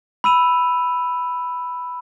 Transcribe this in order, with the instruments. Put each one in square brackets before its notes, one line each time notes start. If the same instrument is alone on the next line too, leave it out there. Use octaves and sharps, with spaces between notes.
[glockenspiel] B5 E6 D#7 F7